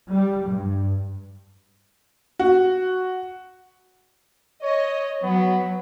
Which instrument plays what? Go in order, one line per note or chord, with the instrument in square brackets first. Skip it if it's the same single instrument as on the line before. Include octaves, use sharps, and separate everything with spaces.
[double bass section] G3
G2
[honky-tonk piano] F#4
[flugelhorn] C#5 [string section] D#5
[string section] F#3 [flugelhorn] B3